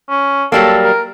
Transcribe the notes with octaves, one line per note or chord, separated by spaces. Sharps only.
C#4
F#3 G3 A#3 A4
A#4